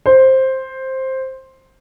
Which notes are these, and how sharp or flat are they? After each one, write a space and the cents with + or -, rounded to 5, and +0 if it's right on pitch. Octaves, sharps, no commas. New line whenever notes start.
C5 +10